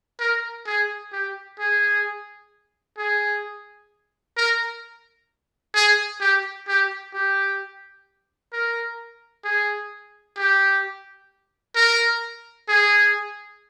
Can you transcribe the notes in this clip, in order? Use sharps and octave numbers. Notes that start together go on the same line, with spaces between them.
A#4
G#4
G4
G#4
G#4
A#4
G#4
G4
G4
G4
A#4
G#4
G4
A#4
G#4